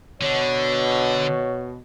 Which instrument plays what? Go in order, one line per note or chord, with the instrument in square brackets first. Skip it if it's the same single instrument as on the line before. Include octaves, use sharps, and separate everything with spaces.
[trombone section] B2 [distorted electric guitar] D3 [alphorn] C#5